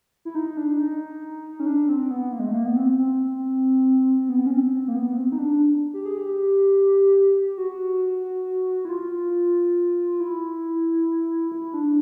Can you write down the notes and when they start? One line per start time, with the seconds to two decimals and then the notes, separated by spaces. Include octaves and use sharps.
0.25 E4
0.35 D#4
0.57 D4
0.79 D#4
1.60 C#4
1.66 D4
1.89 C4
2.11 B3
2.33 A#3
2.39 G#3
2.47 A3
2.54 A#3
2.66 B3
2.76 C4
2.98 C4
4.29 B3
4.46 C#4
4.51 C4
4.73 C4
4.88 A#3
4.95 B3
5.17 C4
5.32 D#4
5.39 D4
5.94 G4
6.06 G#4
6.18 G4
7.58 F#4
8.85 E4
8.89 F4
10.20 E4
11.51 E4
11.74 D4